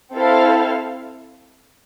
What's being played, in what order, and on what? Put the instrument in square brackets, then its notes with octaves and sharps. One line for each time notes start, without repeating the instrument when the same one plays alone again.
[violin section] C4 E4 A4 C5 F5